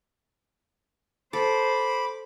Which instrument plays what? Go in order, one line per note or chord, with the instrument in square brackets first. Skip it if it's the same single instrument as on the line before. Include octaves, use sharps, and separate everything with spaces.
[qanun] A4 [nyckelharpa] C5 [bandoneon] B5 D6